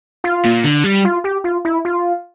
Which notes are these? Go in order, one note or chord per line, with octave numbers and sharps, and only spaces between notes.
F4
A#2
D3
G3
F4
G4
F4
E4
F4